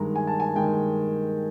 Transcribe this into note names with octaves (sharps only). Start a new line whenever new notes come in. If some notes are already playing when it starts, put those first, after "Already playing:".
Already playing: G2 D#3 G#3 A#5
G#5
A5
G#5
G2 D#3 G#3 G5